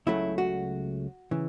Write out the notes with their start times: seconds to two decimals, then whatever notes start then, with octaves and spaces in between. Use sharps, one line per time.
0.07 C#2 C#3 F#3 A3 E4
0.38 F#4
1.31 C#3 E3